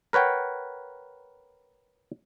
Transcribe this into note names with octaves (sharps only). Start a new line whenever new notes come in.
A#4 B4 C#5 F#5 G5